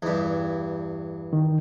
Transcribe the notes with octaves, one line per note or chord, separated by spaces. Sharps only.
E2 G2
D#3